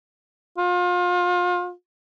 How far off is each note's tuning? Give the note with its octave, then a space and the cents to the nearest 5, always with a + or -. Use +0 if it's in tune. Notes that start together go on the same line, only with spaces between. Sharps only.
F4 +30